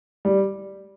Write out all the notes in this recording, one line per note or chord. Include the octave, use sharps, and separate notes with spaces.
G3